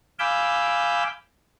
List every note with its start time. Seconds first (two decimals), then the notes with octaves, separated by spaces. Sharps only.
0.19 F5 G#5 B5 D6 E6 G6